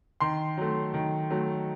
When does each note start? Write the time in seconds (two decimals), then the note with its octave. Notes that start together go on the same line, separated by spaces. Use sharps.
0.20 D#3 C6
0.57 F#3 A3
0.94 D#3
1.30 F#3 A3